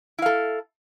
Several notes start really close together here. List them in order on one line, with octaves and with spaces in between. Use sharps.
E4 F5 A4